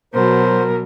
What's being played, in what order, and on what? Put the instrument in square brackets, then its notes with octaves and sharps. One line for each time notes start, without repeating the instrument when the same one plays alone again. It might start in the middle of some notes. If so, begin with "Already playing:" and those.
[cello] B2 F#3 [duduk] A#4 [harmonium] C5